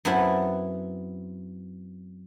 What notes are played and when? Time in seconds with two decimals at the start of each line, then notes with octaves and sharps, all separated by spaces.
0.05 F#2 B3 C4 E4 A4 F#5